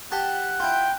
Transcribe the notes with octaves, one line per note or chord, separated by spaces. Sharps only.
G4 F#5 A5
E4 F4 G5